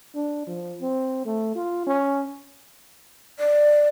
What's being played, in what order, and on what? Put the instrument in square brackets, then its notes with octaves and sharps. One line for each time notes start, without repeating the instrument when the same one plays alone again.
[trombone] D4
F3
C4
A3
F4
C#4
[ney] D5